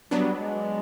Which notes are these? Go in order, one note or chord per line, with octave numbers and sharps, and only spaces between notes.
F#3 G3 B3 D4
G#3